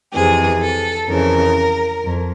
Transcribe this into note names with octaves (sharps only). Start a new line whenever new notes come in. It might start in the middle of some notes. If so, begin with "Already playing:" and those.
F2 C3 E3 G#4
A4
F2 C#3 E3 A#4
F2